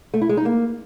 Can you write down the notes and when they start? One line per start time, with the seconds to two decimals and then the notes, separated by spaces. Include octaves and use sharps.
0.14 A3
0.21 E4
0.29 G#3
0.37 D#4
0.45 A#3